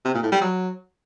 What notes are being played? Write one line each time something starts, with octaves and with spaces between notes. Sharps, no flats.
C3
A#2
A2
G3
F#3